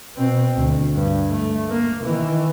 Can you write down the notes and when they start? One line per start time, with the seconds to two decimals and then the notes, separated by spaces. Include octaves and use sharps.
0.16 B2 C4
0.56 D2
0.94 G2
1.30 A3
1.69 A#3
2.03 D#3 E3